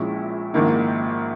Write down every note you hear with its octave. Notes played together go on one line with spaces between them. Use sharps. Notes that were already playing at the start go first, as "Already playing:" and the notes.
Already playing: A#1 A#2 G#3 C#4 E4
A#1 G#2 D#3 A#3 E4